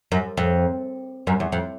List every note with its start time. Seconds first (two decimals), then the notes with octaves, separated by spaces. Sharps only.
0.12 F#2
0.37 F2
1.27 F#2
1.40 E2
1.52 F2